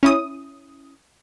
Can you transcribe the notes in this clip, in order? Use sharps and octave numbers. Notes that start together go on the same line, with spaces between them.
C#4 E4 D#6